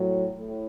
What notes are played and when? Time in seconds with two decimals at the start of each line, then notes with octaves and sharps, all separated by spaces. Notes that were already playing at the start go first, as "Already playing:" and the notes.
Already playing: A2 F#3
0.38 A2